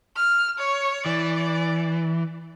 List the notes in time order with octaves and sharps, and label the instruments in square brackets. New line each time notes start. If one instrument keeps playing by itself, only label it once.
[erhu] F6
C#5
[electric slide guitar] E3 [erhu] D5